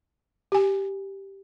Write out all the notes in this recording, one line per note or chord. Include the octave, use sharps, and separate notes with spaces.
G4 G#5